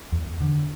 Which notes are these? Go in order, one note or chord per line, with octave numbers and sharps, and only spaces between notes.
E2
D3